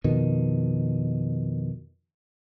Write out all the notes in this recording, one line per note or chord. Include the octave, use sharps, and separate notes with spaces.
F2 B2 D#3